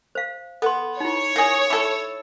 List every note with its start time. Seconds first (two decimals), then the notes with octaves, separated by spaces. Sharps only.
0.15 C5 F5
0.62 B3 A4 C6
1.00 D#4 E4 C#5
1.36 A#3 G#4
1.70 E4 A4 D6